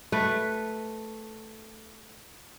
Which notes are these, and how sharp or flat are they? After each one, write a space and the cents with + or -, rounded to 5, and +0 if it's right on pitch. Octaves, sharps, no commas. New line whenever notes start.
A3 +0 B4 +0 D#5 +10